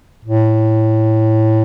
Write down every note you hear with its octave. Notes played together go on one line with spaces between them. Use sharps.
A2